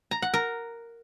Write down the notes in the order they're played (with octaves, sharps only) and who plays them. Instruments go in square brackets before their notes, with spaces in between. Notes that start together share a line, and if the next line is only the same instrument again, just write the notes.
[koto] A#5
F#5
A#4